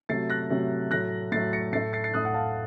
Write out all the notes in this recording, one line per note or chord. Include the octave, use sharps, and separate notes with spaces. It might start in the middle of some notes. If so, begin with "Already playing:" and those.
C3 F#3 A3 A6 C7
F#6 A#6
C3 F#3 A3
A2 F#3 A3 F#6 A#6
A2 F#3 A3 A6 C7
A#6 C#7
A2 A3 A6 C7
A6 C7
A6 C7
A2 A3 D#6 F#6
F#5
F5 A5